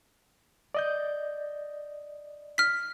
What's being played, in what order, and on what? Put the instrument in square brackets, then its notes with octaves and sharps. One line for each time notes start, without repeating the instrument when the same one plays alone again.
[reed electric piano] D5 D#5 G6
[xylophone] F6 B6